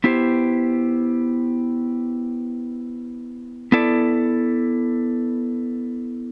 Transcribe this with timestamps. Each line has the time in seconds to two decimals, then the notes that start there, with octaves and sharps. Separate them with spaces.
0.04 B3 E4 G4 C5
3.72 B3 E4 A4 D5